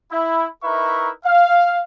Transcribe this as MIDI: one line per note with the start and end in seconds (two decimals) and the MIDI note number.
0.12 0.48 64
0.63 1.11 63
0.63 1.11 64
0.63 1.11 70
0.63 1.11 71
0.63 1.11 76
0.63 1.11 85
1.25 1.80 77